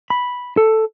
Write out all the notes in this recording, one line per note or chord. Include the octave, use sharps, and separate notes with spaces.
B5
A4